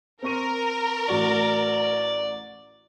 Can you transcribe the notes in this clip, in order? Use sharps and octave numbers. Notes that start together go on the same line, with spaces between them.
C4 A#4 C#6 D#7
A1 F#4 D5 C#6